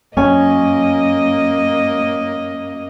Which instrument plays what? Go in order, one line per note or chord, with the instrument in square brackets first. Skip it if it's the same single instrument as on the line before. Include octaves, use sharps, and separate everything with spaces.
[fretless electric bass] F#2 [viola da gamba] A#3 D#5 [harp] C#4 G#5